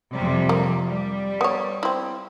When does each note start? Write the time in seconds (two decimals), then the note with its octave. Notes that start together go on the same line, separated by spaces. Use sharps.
0.13 F2 C3 G3
0.49 A#3
0.89 G3
1.41 B3 C#5
1.83 C4 E4